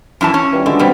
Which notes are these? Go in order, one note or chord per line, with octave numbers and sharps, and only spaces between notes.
F#2 E3 A5
C#4
E3 G3 D6
D3 G#3 F#4
B2 G3 B3 C4